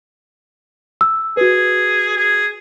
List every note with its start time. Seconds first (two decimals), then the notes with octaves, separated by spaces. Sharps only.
1.01 E6
1.37 F#4 G#4 B4
2.17 G#4